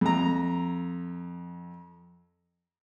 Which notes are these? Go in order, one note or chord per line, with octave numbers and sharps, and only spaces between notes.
F2 A#5